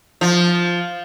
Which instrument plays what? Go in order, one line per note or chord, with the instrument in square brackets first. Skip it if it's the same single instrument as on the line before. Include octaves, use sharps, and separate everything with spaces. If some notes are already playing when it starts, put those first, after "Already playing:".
[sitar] F3